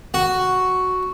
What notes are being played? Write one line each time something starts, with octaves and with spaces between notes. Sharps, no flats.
F#4